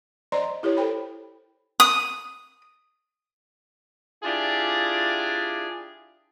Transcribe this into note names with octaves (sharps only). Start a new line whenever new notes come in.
C5 D5 D#5 A#5 C6
E4 G4 A#4 C#5
A4 C5 G5 B5
D#6
D4 E4 F4 G4 G#4 D5